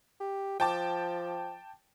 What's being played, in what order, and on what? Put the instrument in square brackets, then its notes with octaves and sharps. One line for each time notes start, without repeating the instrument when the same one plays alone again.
[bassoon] G4
[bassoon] F3 [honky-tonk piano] G5 A5 D6